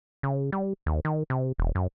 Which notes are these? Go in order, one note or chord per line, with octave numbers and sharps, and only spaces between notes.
C#3
G3
D#2
D#3
C3
E1
F#2